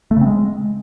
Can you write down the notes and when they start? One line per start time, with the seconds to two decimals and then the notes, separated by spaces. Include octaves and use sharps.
0.11 A3
0.16 C#3
0.21 C4
0.26 G#3